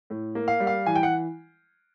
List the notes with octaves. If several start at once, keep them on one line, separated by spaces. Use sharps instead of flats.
A2
A#3
F5
G3
F5
E3 G#5
G5
F#5